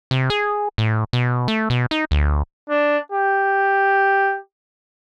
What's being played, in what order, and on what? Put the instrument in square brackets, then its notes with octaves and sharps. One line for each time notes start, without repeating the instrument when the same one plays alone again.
[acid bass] C3
G#4
A2
B2
A3
B2
D#4
D2
[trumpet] D4
G4